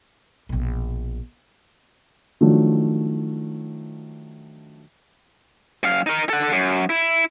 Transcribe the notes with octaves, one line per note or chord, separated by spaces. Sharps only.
A#1 B2
D#3 F3 F#3 A3 D4
F#2 F5
D#4 A#4
A4 F#5
F#2
E4